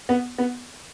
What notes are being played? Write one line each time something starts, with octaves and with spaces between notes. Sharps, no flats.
B3
B3